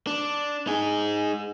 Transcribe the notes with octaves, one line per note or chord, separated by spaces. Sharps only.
D4
D#4 G#4